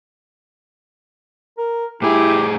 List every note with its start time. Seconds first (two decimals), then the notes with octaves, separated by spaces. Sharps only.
1.58 A#4
2.02 A2 E4 G4 G#4